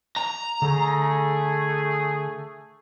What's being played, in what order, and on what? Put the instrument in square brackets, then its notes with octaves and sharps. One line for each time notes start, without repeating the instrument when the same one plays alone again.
[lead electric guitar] A#5
[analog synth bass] D3 [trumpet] A3 [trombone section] G#4